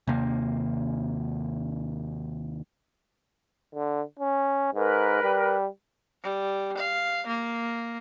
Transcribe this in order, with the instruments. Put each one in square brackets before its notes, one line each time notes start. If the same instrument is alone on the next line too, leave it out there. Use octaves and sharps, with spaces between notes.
[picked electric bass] D#2 C3 A#3
[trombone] D3
C#4
[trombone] G#2 [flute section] A#4 B4
[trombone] G3
[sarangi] G3
F5
A#3